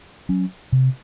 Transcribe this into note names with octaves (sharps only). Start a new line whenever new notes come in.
F#3 C#4
C3